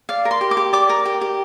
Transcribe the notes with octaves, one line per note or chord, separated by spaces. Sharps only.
D5 F5
A#4
C6
G4
D6
G4
D5 D6
A#4
G4
G4